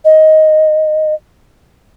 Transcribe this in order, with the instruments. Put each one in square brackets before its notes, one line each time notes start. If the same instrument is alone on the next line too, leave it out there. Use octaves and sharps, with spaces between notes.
[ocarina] D#5